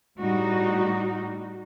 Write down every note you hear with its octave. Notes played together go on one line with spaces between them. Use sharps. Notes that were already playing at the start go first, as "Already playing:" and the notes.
A2 G3 D#4 F#4